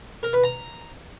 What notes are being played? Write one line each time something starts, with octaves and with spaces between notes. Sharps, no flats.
A#4
B4
A#5